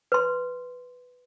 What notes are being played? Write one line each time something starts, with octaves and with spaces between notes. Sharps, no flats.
B4 C6